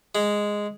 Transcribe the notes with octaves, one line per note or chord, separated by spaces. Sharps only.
G#3